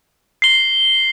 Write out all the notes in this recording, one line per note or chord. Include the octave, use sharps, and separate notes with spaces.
C7 G7